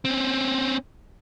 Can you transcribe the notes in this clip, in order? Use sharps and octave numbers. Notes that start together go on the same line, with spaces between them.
C4 C#4